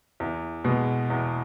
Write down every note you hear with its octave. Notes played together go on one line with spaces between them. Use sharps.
E2
B2 G#3
E2